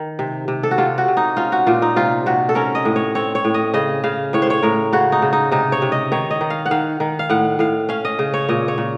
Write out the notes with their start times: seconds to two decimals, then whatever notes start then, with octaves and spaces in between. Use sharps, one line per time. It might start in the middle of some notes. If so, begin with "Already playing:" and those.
Already playing: D#3
0.19 C3
0.48 C3
0.63 A4
0.71 F#4
0.78 C3 F4
0.98 F#4
1.08 C3
1.17 D#4
1.37 C#4 F4
1.52 F#4
1.67 A#2 F4
1.82 D#4
1.96 C3 F4
2.26 C3 F#4
2.49 A4
2.55 C#4 A#4
2.75 D#5
2.85 A2
2.96 C#5
3.15 C4 C#5
3.35 C#5
3.45 A2
3.54 D#5
3.74 C#3 D#5
4.04 C#3 F5
4.33 A2 C#5
4.42 C5
4.50 C#5
4.63 A2 A#4
4.93 C#3 F#4
5.12 D#4
5.22 C#3
5.33 D#4
5.51 C3 D#4
5.72 C#5
5.82 C3
5.92 D#5
6.12 D#3 C#5
6.31 D#5
6.41 D#3
6.50 F5
6.66 F#5
6.71 D#3 F5
7.00 D#3
7.19 F5
7.29 A2 F#5
7.59 A2 F5
7.89 C#4 F5
8.05 D#5
8.19 C#3
8.34 C#5
8.49 A#2 D#5
8.68 C#5
8.78 A#2